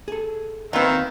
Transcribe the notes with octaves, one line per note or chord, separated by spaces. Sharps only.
G#4 A4
D#2 D#3 C4 F4 B4 E5